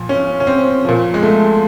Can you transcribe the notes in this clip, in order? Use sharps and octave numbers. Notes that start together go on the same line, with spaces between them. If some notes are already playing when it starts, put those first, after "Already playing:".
Already playing: A#2 F3
C#4
C#4
C4
A#2 F3
G#3
A3